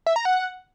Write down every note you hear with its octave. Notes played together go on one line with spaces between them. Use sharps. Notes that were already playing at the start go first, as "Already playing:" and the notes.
E5
A#5
F#5